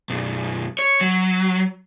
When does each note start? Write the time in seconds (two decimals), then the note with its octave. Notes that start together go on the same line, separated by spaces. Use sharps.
0.10 B1 F#2
0.79 C#5
1.01 F#3